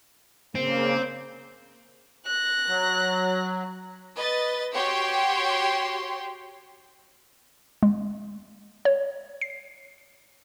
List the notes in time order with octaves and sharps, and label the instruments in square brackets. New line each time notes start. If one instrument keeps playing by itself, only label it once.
[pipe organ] C#3 A#3 [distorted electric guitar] C4
[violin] F#6 A#6
[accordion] F#3
[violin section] B4 D#5 A6
F#4 G4 C#5 G5 C6
[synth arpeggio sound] G#3
C#5
C7